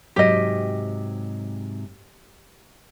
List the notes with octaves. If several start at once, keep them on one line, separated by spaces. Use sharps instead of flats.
G#2 C3 F#3 G4 D#5